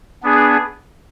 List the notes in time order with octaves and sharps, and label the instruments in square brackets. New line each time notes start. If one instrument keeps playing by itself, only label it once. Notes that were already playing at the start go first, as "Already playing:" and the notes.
[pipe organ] B3 D4 G#4